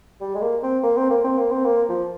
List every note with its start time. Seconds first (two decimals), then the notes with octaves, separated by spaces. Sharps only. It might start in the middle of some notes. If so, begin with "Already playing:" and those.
0.21 G3
0.35 G#3
0.42 A#3
0.63 C4
0.83 A#3
0.97 C4
1.11 A#3
1.24 C4
1.38 A#3
1.52 C4
1.66 A#3
1.89 F3